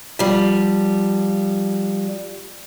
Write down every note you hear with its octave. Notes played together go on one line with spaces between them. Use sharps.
F3 G3